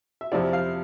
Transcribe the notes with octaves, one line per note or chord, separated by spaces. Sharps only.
E5
F2 C3 F3 C4 E4 D5
F5